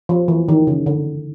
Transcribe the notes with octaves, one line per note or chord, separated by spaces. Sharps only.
F3
E3
D#3
C#3
D3